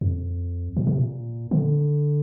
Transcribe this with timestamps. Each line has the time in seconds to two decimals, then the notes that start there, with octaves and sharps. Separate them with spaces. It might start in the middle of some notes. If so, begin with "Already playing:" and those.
0.01 F2
0.77 A#2
0.87 C3
0.98 A#2
1.51 D3